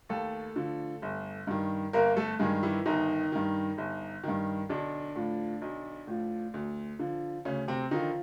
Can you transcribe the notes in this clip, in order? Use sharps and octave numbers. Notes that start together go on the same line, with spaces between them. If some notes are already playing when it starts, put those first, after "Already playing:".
D#2 A3 A4
D3 F3
G1
G2 D#3
G1 A#3 A#4
A3 A4
G2 D#3 G#3 G#4
E3 E4
G1 D#3 D#4
G2 D#3
G1
G2 D#3
B1 D3 D4
A2 F3
B1
A2 F3
D2
D3 F3
D2 C#3 C#4
C3 C4
D3 D#3 F3 D#4